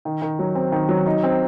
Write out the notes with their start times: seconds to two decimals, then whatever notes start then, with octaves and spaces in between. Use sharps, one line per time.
0.05 D#3
0.22 D#3
0.39 F#3
0.55 C4
0.72 D#3
0.89 F#3
1.06 D#4
1.23 C4